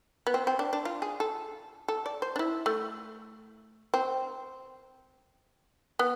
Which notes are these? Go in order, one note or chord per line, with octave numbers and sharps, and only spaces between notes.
B3
C4
C4
D4
D4
F4
G#4
A4
A4
D5
C5
D4
E4
A3
C4
B3